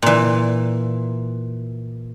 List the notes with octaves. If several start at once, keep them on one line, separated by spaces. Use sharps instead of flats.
A#2 E3